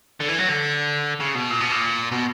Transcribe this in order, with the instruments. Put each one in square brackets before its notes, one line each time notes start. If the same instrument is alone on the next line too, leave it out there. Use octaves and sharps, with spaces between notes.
[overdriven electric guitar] D3
E3
F#3
D3
C#3
B2
A#2
B2
A#2
B2